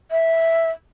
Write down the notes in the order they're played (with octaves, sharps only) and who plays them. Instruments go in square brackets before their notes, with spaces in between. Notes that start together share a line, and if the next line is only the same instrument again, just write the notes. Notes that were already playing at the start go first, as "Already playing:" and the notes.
[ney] E5